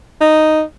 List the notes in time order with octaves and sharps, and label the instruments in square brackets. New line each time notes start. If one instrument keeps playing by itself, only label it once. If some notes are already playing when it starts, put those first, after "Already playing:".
[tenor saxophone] D#4